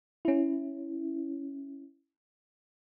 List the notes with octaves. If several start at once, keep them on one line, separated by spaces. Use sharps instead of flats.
C#4 E4